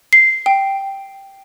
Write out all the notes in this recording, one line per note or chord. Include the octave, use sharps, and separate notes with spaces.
C7
G5